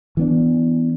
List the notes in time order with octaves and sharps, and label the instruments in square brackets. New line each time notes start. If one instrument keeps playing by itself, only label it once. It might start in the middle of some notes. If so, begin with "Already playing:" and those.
[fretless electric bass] E3 B3 D4